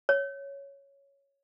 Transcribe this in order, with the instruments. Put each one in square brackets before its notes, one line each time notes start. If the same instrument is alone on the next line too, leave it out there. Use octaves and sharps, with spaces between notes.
[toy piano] C#5